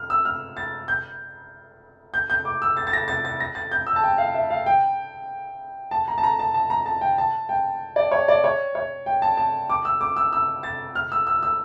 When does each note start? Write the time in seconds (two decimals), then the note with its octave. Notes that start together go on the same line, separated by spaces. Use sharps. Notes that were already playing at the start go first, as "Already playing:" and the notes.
Already playing: F6
0.10 E6
0.25 F6
0.57 A6
0.88 G6
2.14 G6
2.30 G6
2.45 D6
2.62 E6
2.77 A6
2.87 A6
2.93 A#6
3.08 A6
3.25 A6
3.40 A#6
3.55 A6
3.71 G6
3.87 E6
3.96 A5
4.03 G5
4.18 F5
4.34 E5
4.50 F5
4.66 G5
5.91 A5
6.08 A#5
6.18 A5
6.23 A#5
6.39 A5
6.54 A5
6.70 A#5
6.86 A5
7.01 G5
7.18 A5
7.49 G5
7.96 D5
8.11 C#5
8.28 D5
8.44 C#5
8.75 C#5
9.06 G5
9.22 A5
9.37 A5
9.70 D6
9.85 E6
10.01 D6
10.17 E6
10.33 E6
10.63 A6
10.95 F6
11.12 E6
11.27 E6
11.43 E6